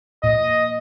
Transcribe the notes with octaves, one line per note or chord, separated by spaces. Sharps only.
A#2 D#5